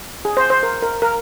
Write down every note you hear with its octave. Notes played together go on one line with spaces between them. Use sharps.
G#4
C5
C5
A#4
A#4
A#4